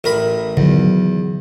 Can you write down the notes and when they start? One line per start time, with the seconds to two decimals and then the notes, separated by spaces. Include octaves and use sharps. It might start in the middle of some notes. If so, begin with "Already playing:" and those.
0.04 A1 A#4 B5
0.57 E2 D3 D#3 F#3